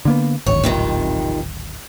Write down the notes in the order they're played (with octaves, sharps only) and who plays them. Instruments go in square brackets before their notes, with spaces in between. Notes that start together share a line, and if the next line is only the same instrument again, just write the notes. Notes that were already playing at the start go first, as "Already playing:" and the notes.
[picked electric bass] D3 A#3 B3
[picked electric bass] D1 G#1 [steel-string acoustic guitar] C#5
[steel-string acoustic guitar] F2 C3 D#3